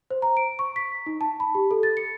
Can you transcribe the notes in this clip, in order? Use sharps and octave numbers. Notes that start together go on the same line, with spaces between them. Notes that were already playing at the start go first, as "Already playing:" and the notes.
C5
A#5
D7
C#6
B6
D#4
A5
B5
G4
A4
A6
C#7